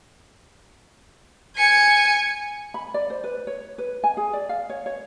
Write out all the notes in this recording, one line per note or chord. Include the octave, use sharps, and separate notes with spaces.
G#5 C#7
B5
D5
C5
B4
C#5
B4
G#5
G#4
D5
F5
C#5
C#5